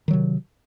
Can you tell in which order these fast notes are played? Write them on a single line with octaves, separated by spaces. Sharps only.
D#3 F#3 C3